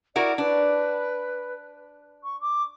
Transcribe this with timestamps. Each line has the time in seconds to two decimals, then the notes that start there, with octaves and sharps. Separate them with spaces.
0.16 E4 F#4 A#4 D5
0.38 D4 B4
2.23 C#6
2.41 D6